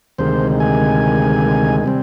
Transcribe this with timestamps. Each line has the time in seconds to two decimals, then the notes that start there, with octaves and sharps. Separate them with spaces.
0.18 D2 C3 D#3 G#3 C5
0.60 G#5
1.84 C3 G3 C4